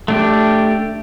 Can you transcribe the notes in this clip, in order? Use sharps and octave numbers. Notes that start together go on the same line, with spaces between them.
A3 D4 G4